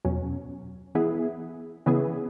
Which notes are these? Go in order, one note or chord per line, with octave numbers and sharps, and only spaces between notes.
E2 B2 F#3 C#4
E3 B3 E4 G#4
C#3 E3 B3 E4 G#4